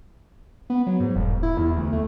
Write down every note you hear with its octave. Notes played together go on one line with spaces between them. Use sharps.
B3
F#3
G#2
E1
E4
E2
D2
A3